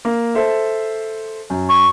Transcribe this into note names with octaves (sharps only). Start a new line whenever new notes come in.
A#3
A4 C5 E5
F#2
C#6